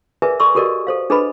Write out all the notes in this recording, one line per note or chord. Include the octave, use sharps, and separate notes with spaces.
G#4 A#4 B4 D5 E5 G#5
A4 D5 C6 C#6 E6
F#4 G4 A4 A#4 D5 D#5
A4 C5 F5
D4 G#4 A4 B4 D#5 B5